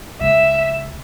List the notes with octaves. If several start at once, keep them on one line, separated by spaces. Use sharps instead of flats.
C#2 C#3 G#3 E5